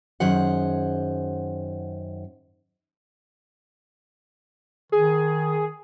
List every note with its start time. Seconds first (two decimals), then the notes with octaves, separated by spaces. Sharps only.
0.20 F#2 D#3 G#4 C5 F#5
4.92 D#3 G#4